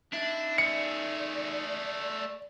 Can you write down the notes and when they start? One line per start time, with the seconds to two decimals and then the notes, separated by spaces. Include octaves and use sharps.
0.13 D4 D#4 E5
0.58 A3 G#4 D5 C#7